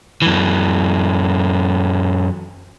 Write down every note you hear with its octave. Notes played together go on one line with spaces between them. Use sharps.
F#2 E3